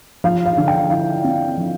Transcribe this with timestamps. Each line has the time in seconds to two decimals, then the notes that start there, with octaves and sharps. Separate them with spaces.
0.24 F3 F5
0.46 F5
0.57 D3
0.68 G5
0.90 E4 F5
1.24 C4
1.57 F3